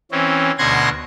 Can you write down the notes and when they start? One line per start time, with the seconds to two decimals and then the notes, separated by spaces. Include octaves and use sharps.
0.11 E3 C4 C#4
0.58 D2 B2 F#5 C6 G#6 A#6